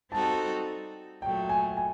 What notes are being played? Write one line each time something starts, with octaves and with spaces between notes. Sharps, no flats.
G3 C4 D#4 F#4 A4 A5
A#2 F#3 A3 G5
G#5
G#5